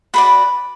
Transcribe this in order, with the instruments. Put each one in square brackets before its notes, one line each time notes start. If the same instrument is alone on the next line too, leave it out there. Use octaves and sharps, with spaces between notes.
[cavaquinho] F#4 B4 D5 B5